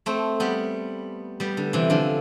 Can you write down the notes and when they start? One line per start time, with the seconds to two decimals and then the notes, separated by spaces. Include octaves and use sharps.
0.06 A3 C4
0.40 G3 B3
1.40 G3 B3
1.57 D3
1.73 C3 E3
1.90 D3 F3